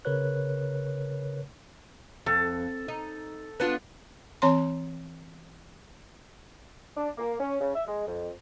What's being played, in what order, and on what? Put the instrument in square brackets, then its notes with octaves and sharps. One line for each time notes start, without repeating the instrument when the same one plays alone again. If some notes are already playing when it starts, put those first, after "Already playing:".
[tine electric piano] C#3 A#4 B4 C#5 F#6
[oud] F2 [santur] A4
[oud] D#4
B3 D4 F4
[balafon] E3 C4 C#5 A#5 C6
[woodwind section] D4
A#3
C#4
C#3
E5
G#3
F2